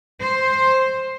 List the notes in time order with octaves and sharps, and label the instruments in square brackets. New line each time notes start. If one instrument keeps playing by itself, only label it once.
[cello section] C5